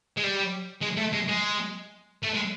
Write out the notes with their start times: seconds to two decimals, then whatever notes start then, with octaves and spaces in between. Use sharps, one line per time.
0.17 G#3
0.24 G3
0.81 G#3
0.97 A3
1.13 G#3
1.28 G#3
2.23 A3
2.34 G#3